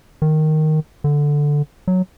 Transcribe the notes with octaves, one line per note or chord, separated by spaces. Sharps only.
D#3
D3
F#3